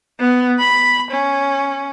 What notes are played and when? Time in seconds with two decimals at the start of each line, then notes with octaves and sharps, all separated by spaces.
0.19 B3
0.59 B5
1.11 C#4